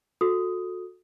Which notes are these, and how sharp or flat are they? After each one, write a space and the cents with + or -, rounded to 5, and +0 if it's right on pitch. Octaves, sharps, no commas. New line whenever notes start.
F#4 -25 A4 +0 D#6 +5